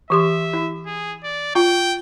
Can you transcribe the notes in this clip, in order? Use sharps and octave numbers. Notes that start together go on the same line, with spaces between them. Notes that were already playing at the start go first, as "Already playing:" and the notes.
E3 G4 E5 C6
E4
G#4
D5
F4 G5